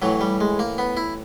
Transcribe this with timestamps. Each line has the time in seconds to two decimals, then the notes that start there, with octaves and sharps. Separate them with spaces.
0.02 A2 E3 F#3
0.21 G3
0.41 G#3
0.59 A#3
0.78 B3
0.97 E4